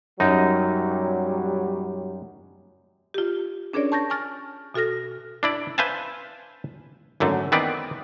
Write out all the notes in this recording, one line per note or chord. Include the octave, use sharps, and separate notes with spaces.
F#2 A#2 F#3 G3 D#4
F4 G4
C#4 D4 G#4 A#4 C#5 D5
A5 C#6 G6 A6 A#6
G#5 C#6 F6 A6
B2 F#4 A4 F6 A#6
D4 E4 D5
B4 C5 E5 F5 G#5 A5
G#1 F#2 D3 A3
D#3 E3 B3 C4 B4 D5